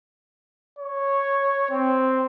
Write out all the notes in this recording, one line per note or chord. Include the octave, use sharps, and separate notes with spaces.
C#5
C4